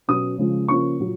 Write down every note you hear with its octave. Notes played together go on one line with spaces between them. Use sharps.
B2 F#3 C#4 D#6
C#3 F3 G#3
C#3 F3 A#3 C#4 F4 C#6
A#2 F#3